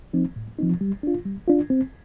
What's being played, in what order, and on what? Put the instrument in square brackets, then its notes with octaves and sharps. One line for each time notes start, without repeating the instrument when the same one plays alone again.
[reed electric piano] F3 C4 D#4
A2
F3 C4 D#4
G3
D4 F4
G3
D4 F4
C4